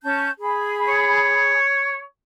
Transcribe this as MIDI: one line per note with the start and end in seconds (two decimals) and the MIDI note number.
0.03 0.30 61
0.03 0.30 81
0.03 0.30 91
0.40 1.58 68
0.40 1.58 83
0.88 2.01 73